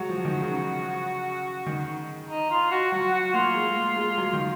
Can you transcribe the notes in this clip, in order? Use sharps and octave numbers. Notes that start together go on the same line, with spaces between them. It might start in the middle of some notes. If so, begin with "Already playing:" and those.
Already playing: F#3 G#3 F#4
F3
D#3
C#3
D#3
D#4
F4
F#4
F#3 F#4
F#4
A#3 F4
G#3
A#3
G#3
F#3
D#3